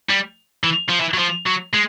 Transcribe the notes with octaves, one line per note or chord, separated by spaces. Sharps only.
G3
E3
F3
E3
F#3
F3
F#3
G#3